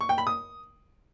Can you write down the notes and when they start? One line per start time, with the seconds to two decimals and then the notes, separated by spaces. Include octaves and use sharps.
0.01 C#6
0.09 G5
0.18 B5
0.27 D#6